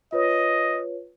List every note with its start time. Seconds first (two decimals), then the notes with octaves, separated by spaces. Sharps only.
0.12 F4 B4 C#5 D#5